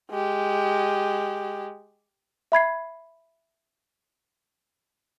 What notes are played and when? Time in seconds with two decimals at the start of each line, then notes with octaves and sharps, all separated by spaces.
0.11 G#3 G4
2.52 E5 B5 G#6 C7